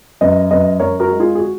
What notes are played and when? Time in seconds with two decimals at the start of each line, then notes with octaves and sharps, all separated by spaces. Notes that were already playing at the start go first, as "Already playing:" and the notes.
0.21 F#2 B4 D#5
0.51 F#2 B4 D#5
0.80 F#2 A#4 C#5
1.00 F#4 A#4
1.10 G#3
1.20 F4 G#4
1.35 G#4
1.40 F#4